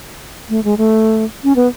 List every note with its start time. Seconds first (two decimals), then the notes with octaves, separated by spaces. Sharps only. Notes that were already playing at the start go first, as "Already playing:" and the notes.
0.50 A3
0.64 G#3
0.78 A3
1.44 C#4
1.56 B3